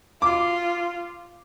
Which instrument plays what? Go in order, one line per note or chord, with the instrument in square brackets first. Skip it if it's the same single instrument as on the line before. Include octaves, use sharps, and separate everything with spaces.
[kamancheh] F4 [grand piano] D6